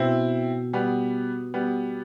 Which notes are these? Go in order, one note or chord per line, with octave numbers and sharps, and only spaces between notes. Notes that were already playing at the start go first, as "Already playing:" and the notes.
Already playing: B2 C4 E4
G3 B3
G3 B3